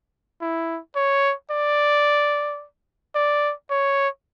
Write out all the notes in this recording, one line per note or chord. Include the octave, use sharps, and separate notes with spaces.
E4
C#5
D5
D5
C#5